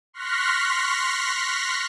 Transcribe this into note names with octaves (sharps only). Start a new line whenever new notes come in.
C6 C#6 F6 F#6 A#6 B6